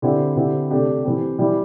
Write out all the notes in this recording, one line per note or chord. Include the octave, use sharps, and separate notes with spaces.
D3 C4 E4 G4
D3 C4 E4 G4
C3 A3 D4 G4
E3 C4 G4
E3 G3 E4 G4